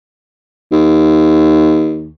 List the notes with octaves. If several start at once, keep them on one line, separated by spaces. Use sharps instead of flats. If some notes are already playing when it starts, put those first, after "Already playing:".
D#2